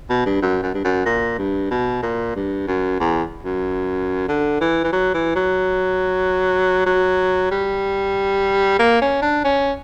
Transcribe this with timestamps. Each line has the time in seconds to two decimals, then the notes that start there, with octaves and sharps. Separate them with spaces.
0.10 B2
0.26 G2
0.42 F#2
0.63 F#2
0.74 G2
0.84 F#2
1.06 A#2
1.38 G2
1.71 B2
2.02 A#2
2.35 G2
2.67 F#2
3.00 E2
3.43 F#2
4.28 D3
4.61 E3
4.84 E3
4.92 F#3
5.14 E3
5.35 F#3
6.86 F#3
7.51 G3
8.79 A#3
9.01 C#4
9.22 D4
9.44 C#4